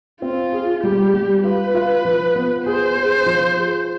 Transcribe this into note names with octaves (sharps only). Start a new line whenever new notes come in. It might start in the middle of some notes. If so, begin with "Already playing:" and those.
C4 F4
G#4
G3 G4
G3
F4 B4
F4
F3
B3
G#4 C5
G#4
F3
G#4